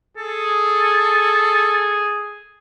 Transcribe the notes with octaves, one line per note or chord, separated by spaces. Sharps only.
G#4 A4